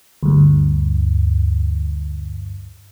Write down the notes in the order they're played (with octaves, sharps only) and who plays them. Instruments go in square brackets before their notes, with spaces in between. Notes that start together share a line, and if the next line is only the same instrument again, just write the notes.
[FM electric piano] D2 G2